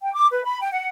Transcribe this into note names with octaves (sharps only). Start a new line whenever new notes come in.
G5
D6
B4
B5
G5
F#5